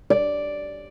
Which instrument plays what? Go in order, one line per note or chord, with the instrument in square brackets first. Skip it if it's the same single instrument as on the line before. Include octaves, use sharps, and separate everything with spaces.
[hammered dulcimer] D5